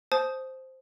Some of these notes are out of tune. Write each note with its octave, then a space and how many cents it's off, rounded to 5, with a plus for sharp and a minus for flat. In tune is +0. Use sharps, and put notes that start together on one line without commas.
C5 +0 A5 -30 D#6 +5